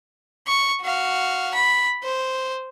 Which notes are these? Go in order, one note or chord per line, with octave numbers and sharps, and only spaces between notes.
C#6
F#4 F5
B5
C5